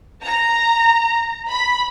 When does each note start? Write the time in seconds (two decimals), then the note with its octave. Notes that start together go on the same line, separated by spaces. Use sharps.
0.23 A#5
1.50 B5